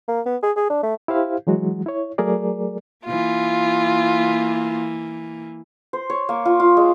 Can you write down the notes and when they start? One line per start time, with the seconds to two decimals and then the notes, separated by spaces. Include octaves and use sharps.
0.08 A#3
0.26 B3
0.43 G#4
0.56 G#4
0.70 D4
0.83 A3
1.08 E4 G4 C5 F5
1.47 E3 F#3 G#3 F#4
1.86 E4 C#5
2.18 F#3 A3 G#4 A#4 D5
3.06 E3 A#3 F4
5.93 C5
6.10 C#5
6.29 A#3
6.45 F4
6.60 F4
6.77 G#3